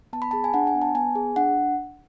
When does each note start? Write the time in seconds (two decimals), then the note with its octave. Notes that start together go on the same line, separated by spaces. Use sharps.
0.13 B3 A5
0.22 B5
0.31 G#4 A5
0.44 G#5
0.54 D4 F#5
0.67 G#5
0.75 B3
0.81 A5
0.95 B3 G#5
1.15 G#4
1.36 D4 F#5